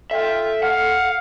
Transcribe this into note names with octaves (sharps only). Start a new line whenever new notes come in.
F4 A4 E5 G5
F5 F#5